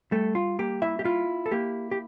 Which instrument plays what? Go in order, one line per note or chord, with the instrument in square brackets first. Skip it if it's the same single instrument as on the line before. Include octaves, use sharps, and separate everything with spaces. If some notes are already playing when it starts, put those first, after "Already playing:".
[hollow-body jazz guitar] G3 A3 A4
F4
A#3 G4
E4 E5
G4
E4 F4
A4
A#3 G4
G4